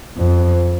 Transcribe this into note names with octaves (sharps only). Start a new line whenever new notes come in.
F2